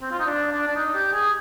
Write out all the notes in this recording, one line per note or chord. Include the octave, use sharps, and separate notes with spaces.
C4
F4
D#4
D4
D4
D4
D#4
G4
G#4